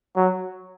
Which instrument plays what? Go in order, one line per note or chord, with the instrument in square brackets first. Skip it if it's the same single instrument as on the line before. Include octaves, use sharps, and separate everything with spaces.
[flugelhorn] F#3